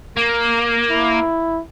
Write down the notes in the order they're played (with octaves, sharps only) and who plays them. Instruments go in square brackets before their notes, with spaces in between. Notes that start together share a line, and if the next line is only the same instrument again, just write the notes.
[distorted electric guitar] A#3
[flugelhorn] E4